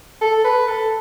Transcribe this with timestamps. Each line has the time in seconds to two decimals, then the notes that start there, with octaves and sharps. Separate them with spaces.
0.21 A4
0.45 B4
0.68 A4